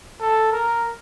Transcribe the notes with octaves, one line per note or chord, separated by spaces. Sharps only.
A4
A#4